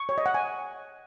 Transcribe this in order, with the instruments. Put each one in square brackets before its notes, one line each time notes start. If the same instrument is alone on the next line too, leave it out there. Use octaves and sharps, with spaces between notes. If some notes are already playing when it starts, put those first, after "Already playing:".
Already playing: [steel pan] C#6
C#5
D#5
F#5
G#5